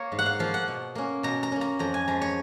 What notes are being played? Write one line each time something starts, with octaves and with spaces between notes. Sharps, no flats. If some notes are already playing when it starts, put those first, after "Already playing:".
Already playing: A#3 A#4 C#5
G#2
F#5
F5
F3 A#3 F5
F#5
B2
A#3 C#4
B2 A#5
A#5
A#3 C#4
A#5
F2 A#5
G#5
F3 G#3 C#4 A#5
C#5